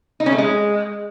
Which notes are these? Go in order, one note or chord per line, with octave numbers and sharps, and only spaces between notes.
D#4
C#4
A3
G#3